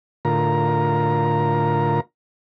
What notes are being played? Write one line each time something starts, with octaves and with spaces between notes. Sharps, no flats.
A2 D3 F4 A#4 A#5